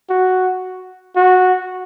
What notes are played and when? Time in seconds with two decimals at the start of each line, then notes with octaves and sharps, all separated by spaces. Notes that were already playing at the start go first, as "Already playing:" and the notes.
0.10 F#4
1.16 F#4